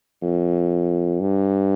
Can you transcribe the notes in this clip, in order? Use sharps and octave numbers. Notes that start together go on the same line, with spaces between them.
F2
G2